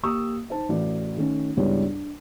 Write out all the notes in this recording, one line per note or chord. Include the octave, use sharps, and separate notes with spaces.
A#3 G4 C#6 D#6 E6
D#4 C5 A5
A1 F#4 D5
D#3 A3 C#4
C#2 G2 G3 B3 E4 C#5
D4